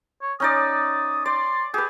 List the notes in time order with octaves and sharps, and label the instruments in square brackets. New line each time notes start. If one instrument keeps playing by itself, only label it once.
[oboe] C#5
[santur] C#4 D#4 D5 [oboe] D#6
[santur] D5 [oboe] C6
[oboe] G4 [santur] G#4 B4